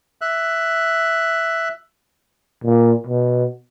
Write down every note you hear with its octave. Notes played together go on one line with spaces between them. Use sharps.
E5 F#6
A#2
B2